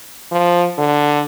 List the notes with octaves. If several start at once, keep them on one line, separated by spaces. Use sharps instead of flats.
F3
D3